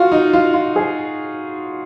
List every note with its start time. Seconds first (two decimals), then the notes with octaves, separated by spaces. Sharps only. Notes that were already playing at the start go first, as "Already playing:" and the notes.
Already playing: F4 F#4
0.12 D#4
0.33 F4
0.54 F4
0.76 G#4